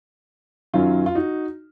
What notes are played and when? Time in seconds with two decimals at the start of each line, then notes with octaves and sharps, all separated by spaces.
0.73 F#2 D#3 F#3 C#4 F4
1.06 F4
1.15 D#4 F#4